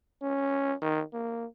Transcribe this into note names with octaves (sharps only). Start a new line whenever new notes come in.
C#4
D#3
A#3